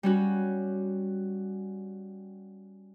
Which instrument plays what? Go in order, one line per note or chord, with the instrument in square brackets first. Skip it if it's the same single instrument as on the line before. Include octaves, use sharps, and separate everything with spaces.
[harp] G3 C#4 F#4